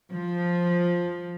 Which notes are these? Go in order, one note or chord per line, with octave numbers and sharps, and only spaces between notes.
F3